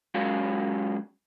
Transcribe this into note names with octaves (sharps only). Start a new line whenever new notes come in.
F#3 G#3 C#4 F#4 A#4 F5